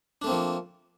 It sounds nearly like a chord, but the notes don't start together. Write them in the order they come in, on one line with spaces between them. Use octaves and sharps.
D4 A3 C4 A#3 F3